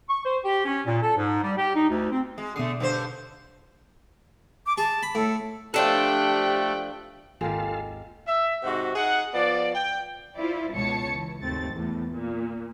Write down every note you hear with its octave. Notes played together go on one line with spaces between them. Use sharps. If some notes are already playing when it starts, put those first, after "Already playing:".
C#6
C5
G4
C#4
A#2
A4
G#2
G3
G4
D#4
D2
C4
G#3
B2 D3 A3 D#6 C7
G2 D3 C5
D6
G#4 A5
B5
A2 A4
F3 A3 D4 G4 A4 G5 F#6
G#1 D#2 G#3 F4 G4 A4 A#4 F5
E5
G#2 C3 F#4
D#4 G#4 F#5
F3 B3 D5
G5
E4 F4 C5 D5
C#2 B2 C#5 A5 C#7
E3
G#1 D#2 A3 C4 A6
E2 A2
A#2